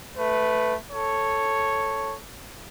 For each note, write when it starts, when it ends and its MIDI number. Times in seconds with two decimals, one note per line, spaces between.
0.17 0.76 57
0.17 0.76 71
0.91 2.16 69
0.91 2.16 73